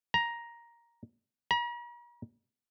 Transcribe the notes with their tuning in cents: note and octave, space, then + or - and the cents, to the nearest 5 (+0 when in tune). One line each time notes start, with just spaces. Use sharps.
A#5 +10
A#5 +45